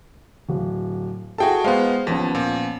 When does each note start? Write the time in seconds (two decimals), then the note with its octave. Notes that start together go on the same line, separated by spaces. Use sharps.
0.49 D1
1.38 E4 F#4 G#4 A4 G5 A5
1.64 G#3 B3 C5 F5
2.07 D#2 F3 B3 C#4
2.35 A#2